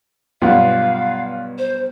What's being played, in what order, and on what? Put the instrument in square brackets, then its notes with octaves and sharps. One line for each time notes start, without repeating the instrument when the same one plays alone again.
[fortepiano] B1 G2 [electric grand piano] F4 F#5 [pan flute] F5
[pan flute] C5